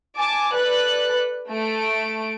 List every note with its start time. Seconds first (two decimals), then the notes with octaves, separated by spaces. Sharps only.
0.16 G#5 A5 D6
0.54 A4 B4 D5 F#6
1.49 A3 D7